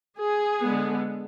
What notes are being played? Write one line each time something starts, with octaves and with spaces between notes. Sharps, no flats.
G#4
D3 G#3 B3